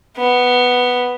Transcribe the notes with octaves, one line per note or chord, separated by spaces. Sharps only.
B3